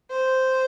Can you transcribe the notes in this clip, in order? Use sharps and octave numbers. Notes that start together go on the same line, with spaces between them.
C5